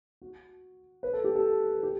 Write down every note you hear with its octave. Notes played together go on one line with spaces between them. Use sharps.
F#4
B4
A4
G4
A4
G4